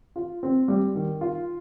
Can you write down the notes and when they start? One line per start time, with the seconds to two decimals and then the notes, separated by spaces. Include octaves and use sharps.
0.16 F4
0.43 C4
0.68 G3
0.95 D#3
1.21 F4